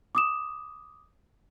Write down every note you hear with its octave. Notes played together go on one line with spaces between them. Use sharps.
D6 D#6 E7